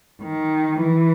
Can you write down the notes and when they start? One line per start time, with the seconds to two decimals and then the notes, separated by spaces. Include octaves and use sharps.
0.23 D#3
0.81 E3